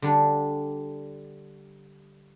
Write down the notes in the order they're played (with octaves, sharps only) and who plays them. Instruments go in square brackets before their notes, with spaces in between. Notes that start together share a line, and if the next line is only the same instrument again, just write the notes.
[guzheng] D3 G3 D4